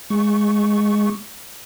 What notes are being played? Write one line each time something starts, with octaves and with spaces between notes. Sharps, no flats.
G#3 C#6